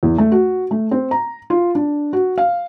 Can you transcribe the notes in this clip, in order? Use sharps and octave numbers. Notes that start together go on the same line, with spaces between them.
E2
A3
F#4
A3
C4
A#5
F4
D4
F#4
F5